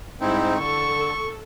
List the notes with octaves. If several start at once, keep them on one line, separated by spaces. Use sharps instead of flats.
G#2 G3 C4 D#4 E4
D3 A4 C#6